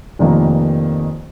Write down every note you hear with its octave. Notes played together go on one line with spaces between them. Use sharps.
F1 F2 D#3 A#3